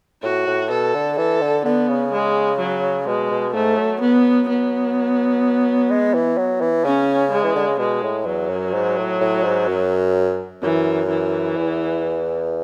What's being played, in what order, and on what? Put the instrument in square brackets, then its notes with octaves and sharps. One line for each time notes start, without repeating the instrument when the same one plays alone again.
[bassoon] A2 [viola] F#4
[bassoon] A2
[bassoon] B2 [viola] A4
[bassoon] D3
[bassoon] E3 [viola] A4
[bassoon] D3
[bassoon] D3 [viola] B3
[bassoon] C#3
[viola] G#3
F#3
[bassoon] B2 [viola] G#3
[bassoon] B2
[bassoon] G#2 [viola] A3
[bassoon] F#3
[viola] B3
B3
[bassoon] G#3
E3
F#3
E3
[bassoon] C#3 [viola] C#4
[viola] G#3
[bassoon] E3
D3
C#3
[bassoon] B2 [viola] G#3
[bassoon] A2
[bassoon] E2 [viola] F#3
[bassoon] F#2
G#2
A2
A2
G#2
F#2
[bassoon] F#2 [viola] E3
[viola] E3
[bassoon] E2